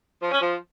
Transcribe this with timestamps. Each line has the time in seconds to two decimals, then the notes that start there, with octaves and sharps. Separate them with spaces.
0.21 F3
0.31 C#4
0.41 F3